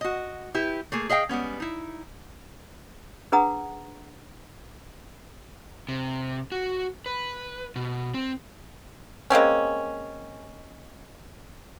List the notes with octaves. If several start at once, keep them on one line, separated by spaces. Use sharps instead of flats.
F#4 D#5
E4 G4 B4
A3 A#3 G#4
G#4 D#5 F5 G5
G3 G#3 B3 C#4
D#4 E4
D4 G#4 B4 F#5 A#5 D#6
C3
F#4
B4
B2
C4
G#3 A#3 C4 C#4